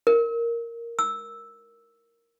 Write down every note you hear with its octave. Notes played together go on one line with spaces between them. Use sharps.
A#4
E6